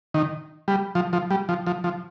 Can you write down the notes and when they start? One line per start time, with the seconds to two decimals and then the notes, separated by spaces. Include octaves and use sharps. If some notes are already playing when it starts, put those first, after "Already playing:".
0.14 D#3
0.68 G3
0.95 F3
1.13 F3
1.31 G3
1.49 F3
1.67 F3
1.84 F3